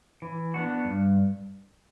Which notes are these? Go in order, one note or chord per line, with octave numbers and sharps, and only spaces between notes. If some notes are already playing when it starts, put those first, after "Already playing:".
E3
B3 D4 F#4
G2